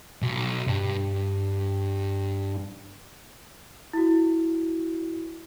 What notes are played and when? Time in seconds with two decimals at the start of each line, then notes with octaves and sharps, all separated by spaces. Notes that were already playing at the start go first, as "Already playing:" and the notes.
0.22 B1
0.68 G2
3.93 E4 F#4